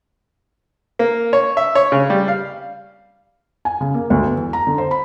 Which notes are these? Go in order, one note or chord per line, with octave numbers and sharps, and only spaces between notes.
A#3
C#5
E5
C#5
C#3
G3
F5
G#5
C#3
A#3
D2
B3
E2
A#5
D3
C5
B5